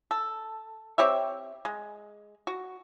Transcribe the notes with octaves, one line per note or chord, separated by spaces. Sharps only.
A4
C4 G4 C#5 E5
G#3
F#4